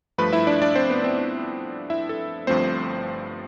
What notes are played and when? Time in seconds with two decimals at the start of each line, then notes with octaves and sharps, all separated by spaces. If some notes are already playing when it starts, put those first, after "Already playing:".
0.18 G2 F3 A3 B4 B5
0.33 E4 E5
0.47 D4 D5
0.62 D4 D5
0.75 C4 C5
0.90 B3 B4
1.04 C4 C5
1.19 D4 D5
1.90 E4 E5
2.09 A4
2.47 G1 G2 F3 A3 C4 C5